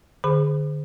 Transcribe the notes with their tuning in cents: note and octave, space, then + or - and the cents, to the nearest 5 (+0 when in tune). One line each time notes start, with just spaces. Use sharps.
D3 +25 G#4 +0 B5 +15